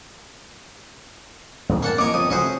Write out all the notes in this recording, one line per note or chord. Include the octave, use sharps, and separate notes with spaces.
E2 A2 C#3
A#3 F#5 A5
E3 A#3 C4 C#5 D#5 D6
G1 F2 D#6
C3 F3 A3 C#4 F#4 C5